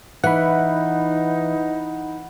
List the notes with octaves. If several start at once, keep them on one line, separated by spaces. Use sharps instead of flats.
E3 D#4 F#5 B5